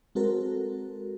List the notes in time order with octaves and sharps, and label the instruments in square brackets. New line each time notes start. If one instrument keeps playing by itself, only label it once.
[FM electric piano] G#3 C4 F#4 A4 A#4